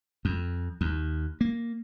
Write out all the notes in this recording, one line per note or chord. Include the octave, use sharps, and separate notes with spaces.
F2
D#2
A#3